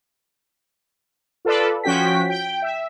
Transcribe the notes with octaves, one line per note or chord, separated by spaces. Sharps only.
F4 A4 B4 D5
F3 C#4 F#4 G5 B6
G5
E5